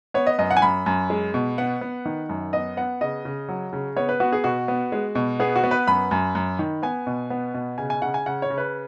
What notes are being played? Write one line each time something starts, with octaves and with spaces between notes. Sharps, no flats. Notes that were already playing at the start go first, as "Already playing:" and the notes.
B3 C#5
D#5
F#2 D#5
F#5
G#5
F#2 B5
F#2
G#3
B2
B3 F#5
B3
D#3
F#2
B3 D#5
B3 F#5
C#3 D#5
C#3
F#3
C#3
B3 C#5
B4
B3 F#4
G#4
B2 F#4
B3
G#3
B2
B3 G#4
F#4
B3
B4
F#2 B5
F#2
F#2
D#3
B3 G#5
B2
B3
B2
C#3 G#5
G#5
C#3 F#5
G#5
C#3 F#5
C#5
C#3
B4